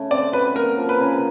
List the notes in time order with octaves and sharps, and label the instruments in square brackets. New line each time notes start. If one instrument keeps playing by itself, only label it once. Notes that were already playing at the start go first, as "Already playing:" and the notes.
Already playing: [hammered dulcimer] C#3 A3
[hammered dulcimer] C4 [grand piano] D5
[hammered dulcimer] F#3 [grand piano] B4
[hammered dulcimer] A#3 [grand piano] A#4
[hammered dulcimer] F3
[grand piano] B4
[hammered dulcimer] C#3